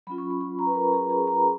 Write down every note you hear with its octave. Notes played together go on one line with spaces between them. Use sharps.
F#3 C#4 F4 B5
C#6
B5
B5
A#5
B4
A#4
G#4
G#4
A#5
B5